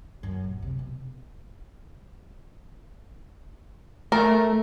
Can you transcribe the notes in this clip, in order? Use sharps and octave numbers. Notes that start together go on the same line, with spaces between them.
F#2
A#1
C3
B2
A3 A#4